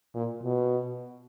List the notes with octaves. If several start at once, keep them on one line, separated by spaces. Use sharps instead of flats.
A#2
B2